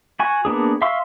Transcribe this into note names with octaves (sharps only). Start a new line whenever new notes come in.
F#4 G#5 C#6
A#3 B3 D4 G#4
E5 F5 C6 C#6 E6